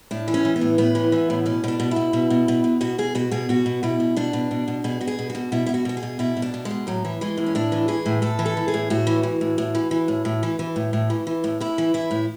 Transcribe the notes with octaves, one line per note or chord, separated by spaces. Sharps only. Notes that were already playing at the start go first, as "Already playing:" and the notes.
A2 D4
E3
C#4
E3
B3
A2
A2 B3
E3
E3
A2
B2 C#4
B2 D4
B2
B2 E4
B2
B2
B2
B2
B2 F#4
B2 G#4
B2 F#4
B2 G#4
B2 F#4
B2
B2 E4
B2
B2 D4
B2
B2
B2
B2 G#4
B2 F#4
G#4
B2
F#4
B2
B2 E4
B2 E4
F#4
B2 F#4
G#4
B2
B2 E4
B2
D4
B2
G#3
B2
A2 F#3
E3
E3 G#3
A2
C#4
A2 D4
E3
E3 G#4
A2
A2 A4
E3
A4
E3
G#4
A2
A2 F#4
E3
E3
A2
A2
E3
E3
A2
A2
E3
E3
A2
A2
E3
E3
A2
A2 E4
E3
E3 E4
A2